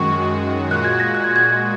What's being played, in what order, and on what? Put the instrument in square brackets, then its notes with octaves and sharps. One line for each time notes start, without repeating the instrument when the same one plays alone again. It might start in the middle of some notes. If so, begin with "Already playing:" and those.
Already playing: [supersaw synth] F#2 D#3 G#3 F#4 [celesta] C#6
[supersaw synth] A#2 G#3 F#4 [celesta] F#6
[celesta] G#6
A#6
F#6
G#6
G#6